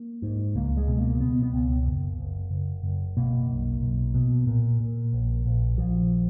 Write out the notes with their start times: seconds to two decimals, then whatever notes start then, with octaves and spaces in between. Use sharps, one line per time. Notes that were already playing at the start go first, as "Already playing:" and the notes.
Already playing: A#3
0.22 G#2
0.55 C#2 A#3
0.77 G#3
0.88 B2
0.99 A#3
1.21 B2 B3
1.43 B3
1.53 C#2
1.86 F#1
2.18 F#1
2.51 F#1
2.84 F#1
3.17 B2 A#3
3.49 B1
3.82 B1
4.15 B2
4.47 A#2
4.80 A#2
5.13 A#1
5.45 A#1
5.77 A#1 F3